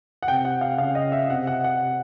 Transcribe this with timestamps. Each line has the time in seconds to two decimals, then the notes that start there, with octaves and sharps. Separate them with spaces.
0.23 F#5
0.28 C3 G5
0.45 F#5
0.61 F5
0.78 C#3 F5
0.95 D#5
1.12 E5
1.29 C3 F#5
1.47 F#5
1.64 F#5